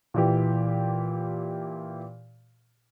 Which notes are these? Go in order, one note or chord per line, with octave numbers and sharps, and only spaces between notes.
A#2 E3 G4